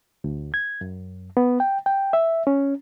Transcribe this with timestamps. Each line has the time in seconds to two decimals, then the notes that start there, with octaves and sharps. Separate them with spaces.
0.24 D2
0.54 G#6
0.81 F#2
1.37 B3
1.60 G5
1.86 G5
2.13 E5
2.47 C#4